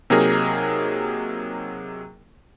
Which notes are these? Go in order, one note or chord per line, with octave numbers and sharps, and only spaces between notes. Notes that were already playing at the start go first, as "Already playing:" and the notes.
C3 F#3 A#3 D#4 G#4 A#4